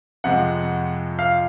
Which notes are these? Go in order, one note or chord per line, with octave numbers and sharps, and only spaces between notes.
F2 C3 F3 G#3 F#5
F5